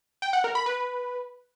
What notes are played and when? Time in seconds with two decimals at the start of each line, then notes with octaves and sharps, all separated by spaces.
0.22 G5
0.33 F#5
0.44 A#4
0.55 B5
0.66 B4